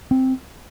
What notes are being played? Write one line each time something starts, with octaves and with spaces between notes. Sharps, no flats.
C4